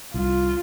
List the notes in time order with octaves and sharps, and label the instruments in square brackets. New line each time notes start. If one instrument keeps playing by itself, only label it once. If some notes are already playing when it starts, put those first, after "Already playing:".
[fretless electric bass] C2 [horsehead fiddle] F4